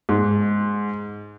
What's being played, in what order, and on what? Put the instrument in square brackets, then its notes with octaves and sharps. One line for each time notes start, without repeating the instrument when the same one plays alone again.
[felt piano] G#2